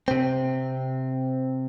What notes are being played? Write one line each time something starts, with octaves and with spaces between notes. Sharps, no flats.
C3 C4